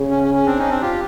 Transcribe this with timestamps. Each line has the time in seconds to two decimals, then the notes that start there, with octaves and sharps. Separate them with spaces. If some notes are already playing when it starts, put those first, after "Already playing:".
Already playing: C#3
0.10 C#4
0.23 C#4
0.34 C#4
0.46 C4 D4
0.58 C#4 D#4
0.69 C4 D4
0.81 F4 G4